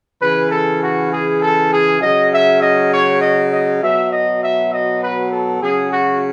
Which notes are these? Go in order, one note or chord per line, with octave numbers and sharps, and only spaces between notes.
C#3 E3 B4
A4
F#4
G#4
A4
G#4
C#3 F#3 D#5
E5
D#5
C#5
D#5
D#5
B2 F#3 E5
D#5
E5
D#5
B4
A4
C#3 F#3 G#4
F#4